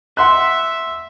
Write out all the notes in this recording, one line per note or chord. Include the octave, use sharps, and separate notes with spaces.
E5 F#5 C6 F#6